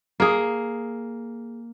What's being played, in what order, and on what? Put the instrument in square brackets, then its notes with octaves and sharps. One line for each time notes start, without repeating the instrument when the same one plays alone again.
[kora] A#3 G#4